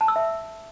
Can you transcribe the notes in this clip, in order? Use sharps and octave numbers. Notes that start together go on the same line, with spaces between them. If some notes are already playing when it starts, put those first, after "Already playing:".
A5
E6
E5